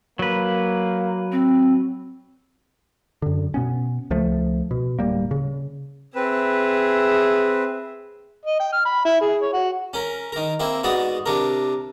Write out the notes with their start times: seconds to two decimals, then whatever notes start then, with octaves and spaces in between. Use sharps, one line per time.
0.19 F#3 A#3 B4
1.32 C4
3.22 F#2 D3
3.54 B2 B3 C#4
4.10 C#2 F3 A3
4.71 B2
4.99 D1 G3 A#3
5.31 C#3
6.15 C4 G#4 B4 E5
8.46 D#5
8.60 G5
8.73 F6
8.85 B5
9.05 E4
9.21 G#4
9.41 C#5
9.53 F#4
9.93 C#4 A#4
10.32 D#3 A#4
10.60 A#3 C4 E4
10.83 G#2 B3 F#4 D5 D#6
11.26 C3 D4 A#4